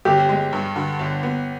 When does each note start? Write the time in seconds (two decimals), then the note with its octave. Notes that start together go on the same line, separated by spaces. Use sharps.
0.05 G1 G4
0.29 G#3
0.53 G2
0.76 D3
0.99 G1
1.23 B3